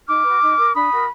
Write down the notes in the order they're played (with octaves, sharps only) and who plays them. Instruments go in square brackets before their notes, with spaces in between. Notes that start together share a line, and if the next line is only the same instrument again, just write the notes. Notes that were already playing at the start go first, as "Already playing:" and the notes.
[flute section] D#4 D6 F6
F#4 B4
D#4
A#4
D4 B5 D#6
F#4 A#4